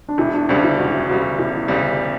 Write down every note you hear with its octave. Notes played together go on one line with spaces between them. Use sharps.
D4
E1 E4
D4
D2 C#3 G3 D4
E4
E1 F#4
D2 C#3 G3 F#4
E1 E4
D2 C#3 G3